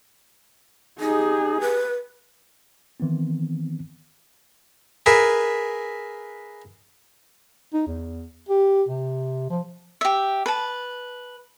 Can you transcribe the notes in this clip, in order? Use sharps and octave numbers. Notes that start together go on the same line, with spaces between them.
D#4 G4 G#4
B4
D#3 E3 B3 C4
G#4 A#4 B4 E5
D#4
E2
G4
C3
F3
G4 E5
B4 A5